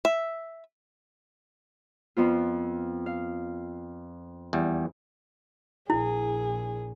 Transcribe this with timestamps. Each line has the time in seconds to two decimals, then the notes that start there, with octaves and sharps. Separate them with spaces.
0.05 E5
2.17 F2 B3 F4
3.06 F5
4.53 E2 G3
5.90 A#1 E4 G#4